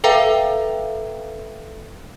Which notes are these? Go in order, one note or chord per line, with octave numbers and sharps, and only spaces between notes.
A4 B4 E5 F5 G5 A#5